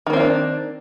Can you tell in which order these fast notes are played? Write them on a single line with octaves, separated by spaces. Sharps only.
D#3 A#3 C4 E4 D4